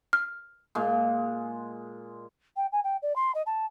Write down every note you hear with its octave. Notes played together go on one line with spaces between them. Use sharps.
F6
A#2 G#3
G5
G#5
G5
D5
C6
D#5
A5